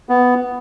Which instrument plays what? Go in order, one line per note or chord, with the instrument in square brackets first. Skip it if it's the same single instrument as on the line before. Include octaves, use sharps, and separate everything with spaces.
[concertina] B3